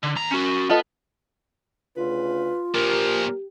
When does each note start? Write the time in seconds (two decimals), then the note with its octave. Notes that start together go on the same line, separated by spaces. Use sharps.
0.03 D3
0.16 D#2 A#5
0.31 C#4 F#4
0.69 B3 F4 A4 D#5
1.96 D2 C#3 F4 B4
2.75 A#2 F3 G4 A#4